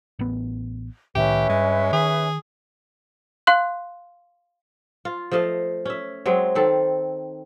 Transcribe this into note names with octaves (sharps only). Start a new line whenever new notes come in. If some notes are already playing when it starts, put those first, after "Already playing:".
A1 B3
C2 A2 D#3 C#4 G4 B4 E5
G2 G#3
D#3 G#4
F5 C6 F#6
F4
F3 A3 D#5 F5
C#4 E5
F#3 G#3 C4
D#3 C4 A4